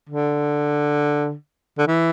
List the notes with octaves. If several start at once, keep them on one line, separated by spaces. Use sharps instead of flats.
D3
D3
E3